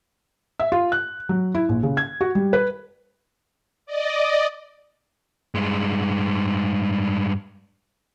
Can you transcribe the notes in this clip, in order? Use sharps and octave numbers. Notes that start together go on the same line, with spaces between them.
E5
F4
F#6
F#3
E4
A#1
C#3
G#6
F#4
G3
B4
D5 D#5
G2 G#3